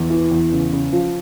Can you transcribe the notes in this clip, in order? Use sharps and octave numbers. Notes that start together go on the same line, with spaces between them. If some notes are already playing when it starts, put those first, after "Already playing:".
Already playing: E2
E3
E2
C#3
C#3
F3